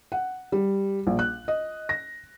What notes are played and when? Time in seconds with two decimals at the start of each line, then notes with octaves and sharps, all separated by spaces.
0.12 F#5
0.52 G3
1.07 A#1
1.19 F#6
1.48 D#5
1.89 A#6